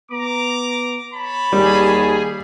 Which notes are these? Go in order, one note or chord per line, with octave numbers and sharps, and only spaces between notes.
B3 A#5 D6
C#5 A5 B5
D#2 G3 G#4